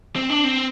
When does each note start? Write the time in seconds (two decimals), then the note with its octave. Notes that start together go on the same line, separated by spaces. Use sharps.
0.16 C4
0.30 D4
0.44 C4